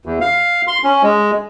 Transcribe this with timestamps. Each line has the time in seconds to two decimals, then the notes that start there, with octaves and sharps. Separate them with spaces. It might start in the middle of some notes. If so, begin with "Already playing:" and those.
0.06 E2
0.21 F5
0.67 C6
0.84 C#4
1.03 G#3